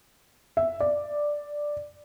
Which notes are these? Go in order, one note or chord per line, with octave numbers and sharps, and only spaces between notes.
E5
D5